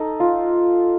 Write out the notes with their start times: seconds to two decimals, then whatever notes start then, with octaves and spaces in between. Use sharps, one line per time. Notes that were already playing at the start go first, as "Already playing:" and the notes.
Already playing: D#4 A4
0.20 F4